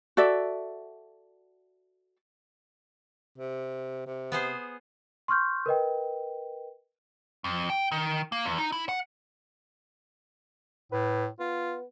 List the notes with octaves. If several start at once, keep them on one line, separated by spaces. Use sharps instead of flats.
F#4 A4 D5 E5
C3
C3
B3 G#4 C5
C6 C#6 F6 G6
A#4 B4 D#5 G5
F2
G5
D#3
A#3
E2
D#4
E4
F#5
A2 B4
B3 F4